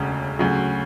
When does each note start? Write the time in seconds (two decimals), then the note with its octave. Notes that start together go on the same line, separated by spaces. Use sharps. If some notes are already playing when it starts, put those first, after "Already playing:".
Already playing: E1 D2 C#3
0.39 D2 C#3 F#3